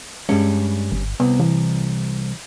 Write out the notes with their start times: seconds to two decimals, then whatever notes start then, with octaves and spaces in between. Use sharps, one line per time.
0.29 G2 G3 G#3 C#4
0.92 G1
1.20 C2 B3
1.40 E3